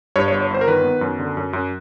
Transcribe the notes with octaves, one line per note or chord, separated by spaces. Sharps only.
G2 C#5
C#5
G1
C#5
G1 C5
A#4
D#3 B4
B3
F#2
D3
F#2
F#2